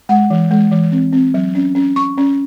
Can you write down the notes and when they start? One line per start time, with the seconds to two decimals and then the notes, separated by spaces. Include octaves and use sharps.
0.09 G#3 F#5
0.30 E3
0.51 G#3
0.72 E3
0.92 C4
1.13 C4
1.34 F#3
1.55 C#4
1.75 C#4
1.96 C#4 C#6
2.17 C#4